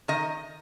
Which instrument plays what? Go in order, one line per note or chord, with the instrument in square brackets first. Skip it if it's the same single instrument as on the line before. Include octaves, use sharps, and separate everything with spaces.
[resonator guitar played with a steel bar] D#3 D#5